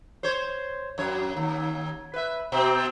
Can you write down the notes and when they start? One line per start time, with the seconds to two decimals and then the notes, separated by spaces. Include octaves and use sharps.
0.23 C5 C#5
0.98 F#2 C#5
1.37 D#2
2.14 B4 E5
2.52 B2 C4